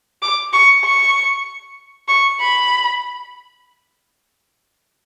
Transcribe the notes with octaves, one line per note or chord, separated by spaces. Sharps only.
D6
C#6
C#6
C#6
B5